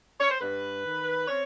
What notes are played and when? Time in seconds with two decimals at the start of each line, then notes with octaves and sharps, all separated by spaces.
0.20 C#5
0.30 C5
0.40 G2 B4
0.84 D#3
1.28 C4 C#5